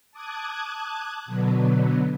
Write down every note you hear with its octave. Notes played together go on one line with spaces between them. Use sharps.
A5 D6 D#6 F#6 G#6
B2 D3 F#3 B3